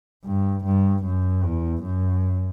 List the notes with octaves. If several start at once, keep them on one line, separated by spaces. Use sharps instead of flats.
G2
G2
F#2
E2
F#2